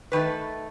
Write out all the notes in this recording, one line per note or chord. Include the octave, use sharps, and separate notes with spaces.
D#3 A3 B4